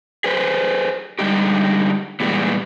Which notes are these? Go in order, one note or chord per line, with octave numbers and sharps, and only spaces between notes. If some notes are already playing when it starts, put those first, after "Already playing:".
G#4 B4 C5
D3 G3 G#3 D#4 G4
A#2 E3 G3 G#3 B3